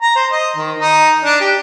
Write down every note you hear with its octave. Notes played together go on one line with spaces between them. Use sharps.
A#5
C5
D#5
D#3
D#4
D4
G4